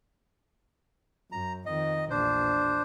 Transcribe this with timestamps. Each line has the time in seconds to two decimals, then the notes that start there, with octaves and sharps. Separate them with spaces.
1.32 F#2 A#5
1.66 F2 D#3 D#5
2.10 A#1 E2 D4 C5